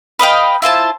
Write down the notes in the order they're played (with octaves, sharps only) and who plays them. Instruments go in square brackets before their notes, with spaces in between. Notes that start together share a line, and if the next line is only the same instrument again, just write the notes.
[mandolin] B4 D#5 F5 G5
E4 F4 C5 A5